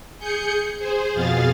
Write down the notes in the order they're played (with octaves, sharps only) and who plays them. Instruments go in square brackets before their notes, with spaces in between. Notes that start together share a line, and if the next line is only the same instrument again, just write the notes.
[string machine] G#4 G6 C#7
G#4 C5
F2 B2 G#4 F5 A6